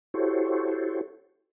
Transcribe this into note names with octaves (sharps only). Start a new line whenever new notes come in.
E4 F#4 G4 A4 C5 C#5